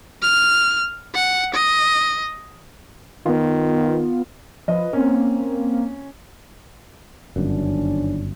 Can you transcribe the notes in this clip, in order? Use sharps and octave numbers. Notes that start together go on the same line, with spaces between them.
F6
F#5
D#5
D#3 B3 F4
F3 B4 D#5
A#3 C4 C#4
G1 F#2 D#3 C#4 D4